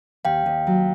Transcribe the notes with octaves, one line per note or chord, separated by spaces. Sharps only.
D#2 F5 G5
D#2
F#3